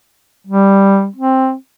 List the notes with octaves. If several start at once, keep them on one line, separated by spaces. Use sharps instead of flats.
G3
C4